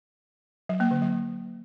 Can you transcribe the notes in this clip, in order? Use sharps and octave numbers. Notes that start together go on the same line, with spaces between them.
F#3
A#3
D3
F#3